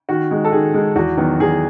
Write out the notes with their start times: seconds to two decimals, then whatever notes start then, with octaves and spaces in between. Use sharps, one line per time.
0.09 D#3 F#4
0.31 G#3 D#4
0.45 A4
0.52 D#3 G#4
0.74 G#3 D#4
0.95 E2 F#4
1.17 D#3 F#3 B3
1.40 E2 G#4